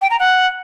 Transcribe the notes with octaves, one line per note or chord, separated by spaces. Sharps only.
G5
A#5
F#5